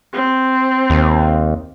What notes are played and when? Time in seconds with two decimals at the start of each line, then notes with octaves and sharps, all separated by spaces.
0.13 C4
0.90 D#2